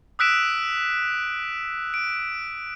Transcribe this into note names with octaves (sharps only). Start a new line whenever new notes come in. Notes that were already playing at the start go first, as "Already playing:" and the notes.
D#6 E6 F#6 B6 D7 E7
D7